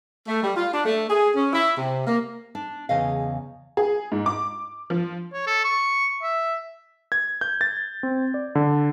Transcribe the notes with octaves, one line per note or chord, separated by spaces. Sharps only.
A3
G3
F4
D4
A3
G#4
C#4
E4
C3
A#3
D4
E2 C#3 D#5 F5
G#4
G#2
D6
F3
C#5
A4
C#6
E5
G#6
G6
A6
C4
D5
D3